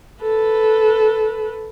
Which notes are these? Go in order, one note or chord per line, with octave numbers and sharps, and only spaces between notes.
A4 B4